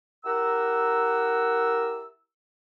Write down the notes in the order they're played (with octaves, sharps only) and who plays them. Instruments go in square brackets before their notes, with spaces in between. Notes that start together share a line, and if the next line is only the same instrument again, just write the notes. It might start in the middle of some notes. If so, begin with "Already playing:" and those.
[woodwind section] E4 G4 A#4 F#5 A#5 E6